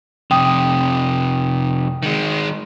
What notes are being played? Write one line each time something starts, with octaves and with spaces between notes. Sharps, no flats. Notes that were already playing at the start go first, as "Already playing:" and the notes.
F2 C3 G5 D#6
D#3 G#3